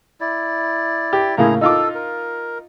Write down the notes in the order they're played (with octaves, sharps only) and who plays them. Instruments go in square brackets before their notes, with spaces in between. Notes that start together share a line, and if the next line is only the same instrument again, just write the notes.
[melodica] E4 D5
[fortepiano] G4
[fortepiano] A2 C#3 A#3 [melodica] E4 G#4 A#5
[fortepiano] D#4 F4 D6 [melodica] A4
[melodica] A#4